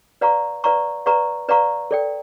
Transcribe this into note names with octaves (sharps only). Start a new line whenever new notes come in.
B4 D5 F5 A#5 C#6
B4 D5 F5 A#5 C#6
B4 D5 F5 A#5 C#6
B4 D5 F5 A#5 C#6
A4 D5 G5